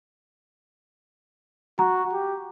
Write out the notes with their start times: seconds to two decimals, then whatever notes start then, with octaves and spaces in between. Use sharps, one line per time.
1.79 F#4 A#5
2.13 G4